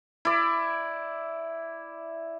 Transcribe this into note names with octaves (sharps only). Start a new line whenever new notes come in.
E4 D5